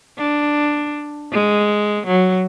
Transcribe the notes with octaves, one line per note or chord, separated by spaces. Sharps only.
D4
G#3
F#3